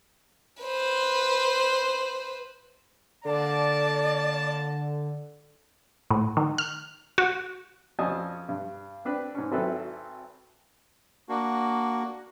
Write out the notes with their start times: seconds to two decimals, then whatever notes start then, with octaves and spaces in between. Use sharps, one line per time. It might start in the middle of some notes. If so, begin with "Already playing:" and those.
0.63 B4 C5
3.25 D3 A#3 D5 A5
6.11 A2
6.37 D#3
6.58 F6
7.18 F#4
7.99 F2 C#4 D#5 G#5 A5 D#6
8.49 G2
9.05 C4 D4 B4
9.35 G#2 C#4
9.52 G#1 F#3 C4 E4 A4 B4
11.29 A#3 D4 F#4